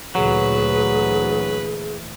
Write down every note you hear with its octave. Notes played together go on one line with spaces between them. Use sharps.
D2 A#2 E3 F#3 G#4 B4